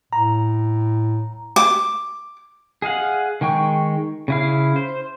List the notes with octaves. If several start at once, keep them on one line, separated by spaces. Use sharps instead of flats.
A2 A#5
D6
G#4 D#5 F5 F#5
D#3 G#3 G5 C#6
C#3 E4 F5
C5